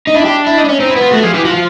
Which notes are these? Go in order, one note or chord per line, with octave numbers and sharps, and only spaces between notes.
D#4
D4 E4
G4
E4
D#4
D4
C#4
C4 D#4
E4
B3
F4
A3 F#4
F3 G#4
E3 G4
F3 F#4
F4